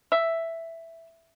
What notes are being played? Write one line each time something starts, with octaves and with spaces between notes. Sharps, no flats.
E5